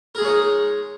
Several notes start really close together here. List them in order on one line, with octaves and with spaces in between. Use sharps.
A#4 G#4 G#3 C#5 D#4